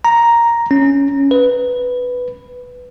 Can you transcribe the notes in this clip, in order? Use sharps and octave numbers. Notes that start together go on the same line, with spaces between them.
A#5
C#4
B4